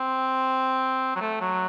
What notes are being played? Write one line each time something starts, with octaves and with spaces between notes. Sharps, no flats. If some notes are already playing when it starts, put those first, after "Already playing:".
Already playing: C4
F#3
A3
F#3